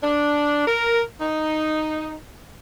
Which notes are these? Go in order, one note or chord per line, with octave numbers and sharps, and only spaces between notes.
D4
A#4
D#4